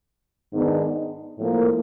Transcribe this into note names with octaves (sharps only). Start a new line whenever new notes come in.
G#2 D#3 G#3 B3 D4
A2 F3 A#3